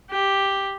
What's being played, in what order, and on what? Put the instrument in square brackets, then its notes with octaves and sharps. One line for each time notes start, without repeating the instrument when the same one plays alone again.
[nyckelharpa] G4